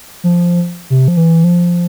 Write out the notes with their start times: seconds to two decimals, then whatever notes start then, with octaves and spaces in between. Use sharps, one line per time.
0.24 F3
0.90 C3
1.08 F3
1.17 E3
1.44 F3